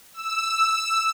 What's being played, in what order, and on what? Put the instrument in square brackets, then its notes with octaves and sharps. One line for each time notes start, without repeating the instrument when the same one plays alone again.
[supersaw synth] E6